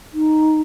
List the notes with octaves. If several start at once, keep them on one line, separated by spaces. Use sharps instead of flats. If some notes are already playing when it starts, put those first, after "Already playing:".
D#4